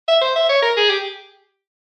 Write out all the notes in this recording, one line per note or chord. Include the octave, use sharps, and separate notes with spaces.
E5
C5
E5
C#5
A#4
G#4
G4